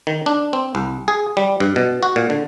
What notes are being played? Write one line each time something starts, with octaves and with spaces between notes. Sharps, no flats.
D#3
D4
C4
C2
G#4
G3
G2
B2
F#4
A#2
D3